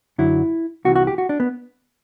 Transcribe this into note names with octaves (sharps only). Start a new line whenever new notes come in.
F#2 D3 F#3 E4
C2 C3 E3 F#4
F#4
G4
F#4
D4
B3